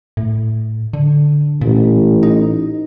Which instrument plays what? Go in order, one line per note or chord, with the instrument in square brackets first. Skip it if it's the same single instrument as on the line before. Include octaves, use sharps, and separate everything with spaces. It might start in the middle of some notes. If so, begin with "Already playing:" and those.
[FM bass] A2
D3
[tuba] A1 [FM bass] A#2
[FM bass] D#4